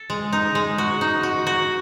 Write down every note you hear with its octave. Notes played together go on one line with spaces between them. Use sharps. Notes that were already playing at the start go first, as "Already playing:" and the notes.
Already playing: A4
G#3
D#4
G#3
F#4
D#4
F#4
F#4